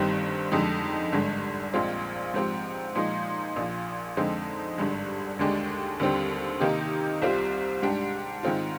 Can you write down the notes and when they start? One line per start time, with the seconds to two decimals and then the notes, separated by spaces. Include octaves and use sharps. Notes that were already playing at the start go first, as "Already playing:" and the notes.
Already playing: G1 G2 D#3 G3 C4
0.52 F2 D3 G#3 D#4 G4
1.12 G#1 G2 D3 G#3
1.74 A#1 A#2 G#3 C4 F4
2.34 G#2 F3 C4 G4
2.95 A#2 F3 G#3 D#4
3.56 A#1 A#2 F3
4.17 F2 D3 G#3 C4 D#4
4.78 G#1 G2 D3 G#3
5.39 D#2 D3 G#3 D4 G4
6.00 D#2 D3 G3 C4
6.60 C3 D#3 A#3 D#4 G4
7.22 C2 C3 G3 C4 F4
7.82 G#2 G3 D4 G4
8.43 G#2 D#3 G#3 C4 F4